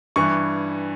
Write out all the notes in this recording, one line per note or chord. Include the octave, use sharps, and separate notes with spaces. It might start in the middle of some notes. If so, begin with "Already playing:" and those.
G2 E3 C#6